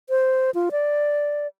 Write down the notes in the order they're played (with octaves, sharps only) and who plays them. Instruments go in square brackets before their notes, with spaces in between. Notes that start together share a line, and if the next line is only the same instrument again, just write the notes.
[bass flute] C5
F4
D5